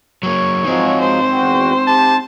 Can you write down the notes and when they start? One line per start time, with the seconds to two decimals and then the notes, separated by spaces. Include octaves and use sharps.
0.23 F#3 A#3 C#5
0.64 F3 F#3 G#3 C4 D#4
1.00 C5
1.33 E2 F#4 G5
1.87 G4 A5